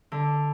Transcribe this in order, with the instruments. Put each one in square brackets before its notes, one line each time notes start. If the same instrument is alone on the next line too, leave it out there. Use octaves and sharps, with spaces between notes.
[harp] D3